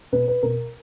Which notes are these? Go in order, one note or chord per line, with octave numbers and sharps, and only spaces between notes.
B2 B4
B4
B2 A#4